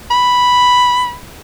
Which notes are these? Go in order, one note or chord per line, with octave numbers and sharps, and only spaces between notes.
B5